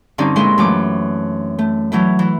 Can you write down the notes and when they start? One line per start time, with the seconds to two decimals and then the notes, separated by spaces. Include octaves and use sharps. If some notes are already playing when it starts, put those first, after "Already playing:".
0.18 G2 D3 C4 C#4 D#4 D5
0.36 A#2 G#3 E4 A4 D#5 C6
0.58 F#2 E3 A3 D6
1.59 A3
1.92 E3 F#3 A3 E4
2.19 E3